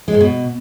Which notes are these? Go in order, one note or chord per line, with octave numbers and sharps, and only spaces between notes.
G#3
G#2
B2